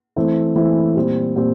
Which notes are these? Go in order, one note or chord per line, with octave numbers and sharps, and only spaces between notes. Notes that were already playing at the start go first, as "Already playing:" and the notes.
E3 A3 C4 E4
E3 A3 C4 E4
A#2 G3 C4
A#2 G3 C4